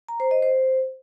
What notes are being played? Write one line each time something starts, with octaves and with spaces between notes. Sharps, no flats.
A#5
C5
D#5
C5